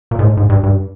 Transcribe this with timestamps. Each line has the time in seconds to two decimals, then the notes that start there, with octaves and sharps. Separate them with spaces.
0.11 A#2
0.19 G#2
0.23 A2
0.37 G#2
0.50 G2
0.63 G2